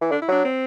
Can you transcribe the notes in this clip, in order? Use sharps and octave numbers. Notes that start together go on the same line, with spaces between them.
E3
D3 D4
E4
F#3 D4
C4